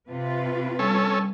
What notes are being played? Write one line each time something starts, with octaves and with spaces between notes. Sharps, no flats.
C3 F4 B4
G3 C#4 A4